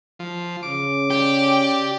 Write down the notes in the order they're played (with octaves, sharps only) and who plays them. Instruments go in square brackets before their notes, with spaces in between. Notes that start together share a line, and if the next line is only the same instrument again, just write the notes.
[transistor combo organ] F3
[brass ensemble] C#3 [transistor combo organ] D6
[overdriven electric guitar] G4 [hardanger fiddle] D5 G5